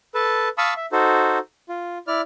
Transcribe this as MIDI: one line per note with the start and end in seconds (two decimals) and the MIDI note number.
0.15 0.49 69
0.15 0.49 71
0.15 0.49 81
0.58 0.74 77
0.58 0.74 81
0.58 0.74 83
0.58 0.74 85
0.58 0.74 87
0.58 0.74 88
0.76 0.86 76
0.92 1.39 63
0.92 1.39 66
0.92 1.39 69
0.92 1.39 72
1.69 1.98 65
2.07 2.21 64
2.07 2.21 74
2.07 2.21 89